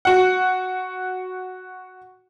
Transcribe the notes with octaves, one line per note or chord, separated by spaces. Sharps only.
F#4 F#5